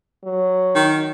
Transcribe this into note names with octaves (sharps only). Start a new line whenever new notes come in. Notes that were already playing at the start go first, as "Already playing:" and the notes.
F#3
D#3